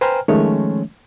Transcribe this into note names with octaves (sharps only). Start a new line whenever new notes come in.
B4 C5 G5 G#5 A#5 F6
D#3 F3 G#3 A3 C#4 C#5